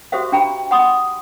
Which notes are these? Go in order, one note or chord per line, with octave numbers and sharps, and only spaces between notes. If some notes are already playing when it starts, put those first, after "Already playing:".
F#4 G4 A4 C5 E5 F5
D4 G4 G5 A#5 B5
F#5 B5 C6 D#6